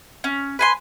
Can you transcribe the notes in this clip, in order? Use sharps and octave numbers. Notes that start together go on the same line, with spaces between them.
C#4
B4 G#5 C6